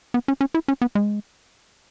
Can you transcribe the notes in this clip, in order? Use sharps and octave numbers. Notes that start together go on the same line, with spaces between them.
B3
C#4
C#4
E4
C#4
B3
G#3